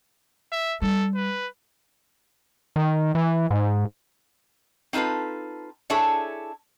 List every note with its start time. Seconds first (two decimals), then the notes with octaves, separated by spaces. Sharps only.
0.52 E5
0.82 G3 D4 A4
1.15 B4
2.76 D#3
3.15 E3
3.51 G#2
4.93 C4 D#4 F4 A4 B4
5.90 D4 E4 G#4 A4 C#5 E5